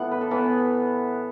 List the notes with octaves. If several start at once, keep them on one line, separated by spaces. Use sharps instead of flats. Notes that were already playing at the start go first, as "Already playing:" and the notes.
Already playing: A2 E3 B3 F#5
B4
A4
A2 E3 B3 B4